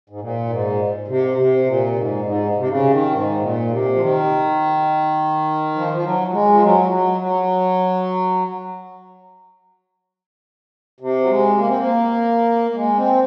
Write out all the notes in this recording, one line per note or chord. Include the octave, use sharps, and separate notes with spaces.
G#2
A#2
G#2
C3
C3
A#2
G#2
G#2
C3
C#3
D#3
G#2
A#2
C3
F3
D#3
F3
F3
F#3
F#3
G#3
F3
F#3
F#3
F#3
C3
F#3
G#3
A#3
C4
A#3
A#3
G#3
C4